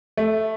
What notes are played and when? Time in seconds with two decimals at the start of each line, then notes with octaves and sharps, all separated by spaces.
0.17 A3